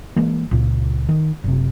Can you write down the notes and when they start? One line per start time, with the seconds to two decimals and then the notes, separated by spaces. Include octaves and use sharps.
0.16 E3 G#3 A#3
0.51 C#2 A#2
1.09 D#3
1.44 F#1 C3